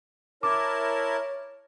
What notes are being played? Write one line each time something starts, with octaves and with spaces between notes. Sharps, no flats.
E4 A#4 C#5 A5 D6